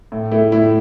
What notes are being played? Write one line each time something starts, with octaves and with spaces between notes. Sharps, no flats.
A2
A3 E4
A2 E4